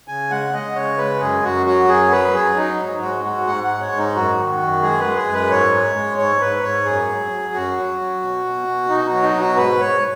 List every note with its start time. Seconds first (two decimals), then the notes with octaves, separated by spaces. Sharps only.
0.08 C#3 G#5
0.30 G#3 F#5
0.53 G#3 D#5
0.76 C#3 C#5
0.98 G#3 B4
1.21 F#2 G#4
1.44 F#2 F#4
1.66 F#3 F#4
1.88 F#2 G#4
2.11 F#3 B4
2.34 F#3 G#4
2.57 F#3 D#4
2.79 G#2
3.02 G#3 F#4
3.24 G#2 F#4
3.47 G#2 F#5
3.64 F#5
3.69 G#3
3.81 C#5
3.92 G#2
3.98 D#4
4.15 F#2 F#4
4.37 D#3
4.61 F#2
4.82 G#3 G#4
4.99 B4
5.06 G#3
5.16 G#4
5.28 F#2
5.33 B4
5.50 G#2 C#5
5.73 G#3
5.95 G#3
6.18 G#2 C#5
6.41 G#2 B4
6.63 G#2 C#5
6.86 F#2 G#4
7.09 F#3
7.31 F#3
7.54 F#2 F#4
7.77 F#3
7.99 F#3
8.22 B2
8.44 B2
8.67 B2
8.89 B2 D#4
9.07 F#4
9.12 F#3
9.23 D#4
9.35 B2
9.40 F#4
9.57 G#2 B4
9.80 G#2 C#5